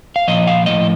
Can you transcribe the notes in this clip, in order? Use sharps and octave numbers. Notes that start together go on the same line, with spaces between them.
F5
A#2 F3 D#5
F5
A2 F3 D#5